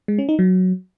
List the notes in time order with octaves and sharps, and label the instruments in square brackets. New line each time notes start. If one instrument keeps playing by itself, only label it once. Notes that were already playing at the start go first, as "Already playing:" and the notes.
[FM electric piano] G#3
C#4
D#4
F#3